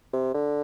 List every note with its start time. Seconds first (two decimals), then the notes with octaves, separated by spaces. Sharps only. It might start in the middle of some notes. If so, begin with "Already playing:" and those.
0.13 C3
0.34 D3